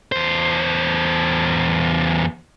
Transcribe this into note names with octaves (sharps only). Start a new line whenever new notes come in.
E2 C5